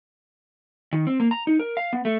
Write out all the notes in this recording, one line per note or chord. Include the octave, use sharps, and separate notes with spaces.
D#3
C4
A#3
A#5
D#4
A#4
F5
B3
A3